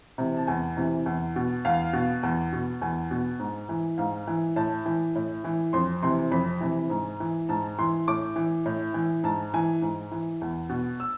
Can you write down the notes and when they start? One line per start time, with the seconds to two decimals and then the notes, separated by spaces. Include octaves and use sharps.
0.18 C3 E3
0.37 A5
0.47 E2 G#5
0.77 C3 E3
1.06 E2
1.36 B2
1.65 E2 F5
1.93 B2
2.23 E2
2.53 B2
2.81 E2 G#5
3.11 B2
3.39 G#2
3.69 E3
3.98 G#2 F5
4.27 E3
4.56 A2 A5
4.86 E3
5.15 A2
5.44 E3
5.73 F2 C6
6.02 C3 E3 C6
6.32 F2 B5
6.61 C3 E3
6.90 G#2
7.20 E3
7.49 G#2 A5
7.79 E3 C6
8.08 A2 D6
8.36 E3
8.66 A2
8.94 E3
9.24 G#2 A5
9.54 E3 G#5
9.82 G#2
10.12 E3
10.41 E2
10.69 B2
11.00 E6